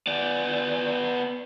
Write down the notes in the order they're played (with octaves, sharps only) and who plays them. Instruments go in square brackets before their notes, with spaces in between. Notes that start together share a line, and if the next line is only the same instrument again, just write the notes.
[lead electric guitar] B3 D5